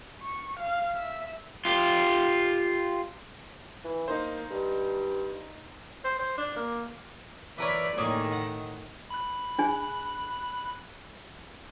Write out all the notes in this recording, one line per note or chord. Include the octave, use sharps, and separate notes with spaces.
C#6
F5
E5
F4 G4
E3
A#3 D#4 C5
G2
C5
C5
D4
A#3
E3 A#4 B4 C#5 D5
A2 D#3 A#3 G#4 C#5
F#5
B5 F#6
D4 G#4 G#5